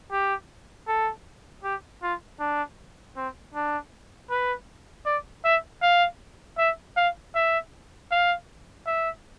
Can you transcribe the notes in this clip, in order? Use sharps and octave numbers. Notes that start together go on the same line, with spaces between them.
G4
A4
G4
F4
D4
C4
D4
B4
D5
E5
F5
E5
F5
E5
F5
E5